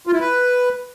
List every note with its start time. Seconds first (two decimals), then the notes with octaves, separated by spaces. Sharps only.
0.07 F4
0.13 E4
0.20 B4